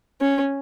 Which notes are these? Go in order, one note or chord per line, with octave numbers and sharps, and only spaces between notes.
C#4